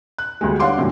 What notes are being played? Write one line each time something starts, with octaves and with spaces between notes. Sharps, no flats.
F#6
D2 G3 G#3
D4 C#5 F5 F#5 C6 D6
F#2 A2 C3